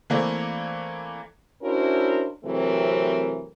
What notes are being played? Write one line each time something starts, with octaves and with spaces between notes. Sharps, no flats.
E3 A3 A#3 C4 D5
C#4 D4 E4 F#4 A#4 C5
C3 E3 F#3 A3 C4 A#4